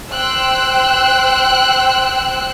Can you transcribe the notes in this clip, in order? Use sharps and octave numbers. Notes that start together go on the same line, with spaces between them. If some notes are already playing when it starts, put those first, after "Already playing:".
C5 G5 E6 F#6